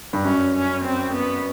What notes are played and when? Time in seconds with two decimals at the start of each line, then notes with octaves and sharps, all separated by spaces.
0.13 G2
0.24 F#2 C#4
0.55 C#4
0.85 C4
1.14 B3